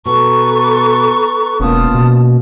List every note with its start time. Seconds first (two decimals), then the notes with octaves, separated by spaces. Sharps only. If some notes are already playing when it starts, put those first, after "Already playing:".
0.05 B2 A4 B4 A#5 C#6
1.60 E1 A#3 B3 C#4 F4 A5 D#6
1.94 B2